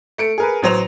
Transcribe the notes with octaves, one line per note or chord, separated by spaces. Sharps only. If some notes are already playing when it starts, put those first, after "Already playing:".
A3 C#7 D7
G#4 A#4 B4
A1 F#3 C5 F7